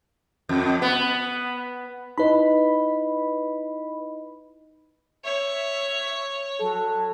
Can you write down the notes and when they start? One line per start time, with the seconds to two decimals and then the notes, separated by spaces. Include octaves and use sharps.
0.49 F2
0.82 B3
2.18 D#4 E4 B4 D#5 B5
5.25 C#5 E5
6.61 F#3 A4